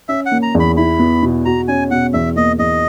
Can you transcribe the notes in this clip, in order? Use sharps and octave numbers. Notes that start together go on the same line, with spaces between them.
C#4 E5
F#5
A#3
A#5
E2
B5
E4 B5
B3
B2
F#4 A#5
C#4 G#5
B2 F#5
E2 E5
A#3 D#5
E2 D#5